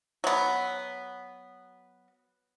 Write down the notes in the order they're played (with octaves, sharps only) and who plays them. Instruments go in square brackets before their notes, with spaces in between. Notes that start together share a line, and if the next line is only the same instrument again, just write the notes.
[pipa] F#3 B3